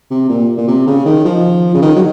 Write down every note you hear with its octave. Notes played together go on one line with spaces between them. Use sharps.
C3
A#2
A#2
C3
C#3
D#3
F3
C#3
D#3
F#3